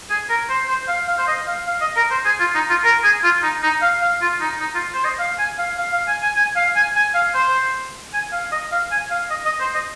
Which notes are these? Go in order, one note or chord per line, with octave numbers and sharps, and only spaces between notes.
G#4
A#4
C5
C5
F5
F5
C5
D#5
F5
F5
D#5
A#4
C5
G#4
F4
D#4
F4
A#4
G#4
F4
D#4
D#4
F5
F5
F4
D#4
D#4
F4
C5
D#5
F5
G#5
F5
F5
F5
G#5
G#5
G#5
F5
G#5
G#5
F5
C5
G#5
F5
D#5
F5
G#5
F5
D#5
D#5
C5
D#5